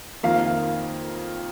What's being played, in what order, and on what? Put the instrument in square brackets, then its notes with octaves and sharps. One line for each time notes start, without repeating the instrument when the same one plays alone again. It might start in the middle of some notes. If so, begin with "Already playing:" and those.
[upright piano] F2 D#3 A#3 F5